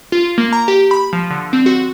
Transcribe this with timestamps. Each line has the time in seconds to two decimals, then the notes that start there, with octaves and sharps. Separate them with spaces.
0.12 F4
0.38 A#3
0.53 A#5
0.68 G4
0.91 B5
1.13 F3
1.31 D3
1.53 C4
1.66 F#4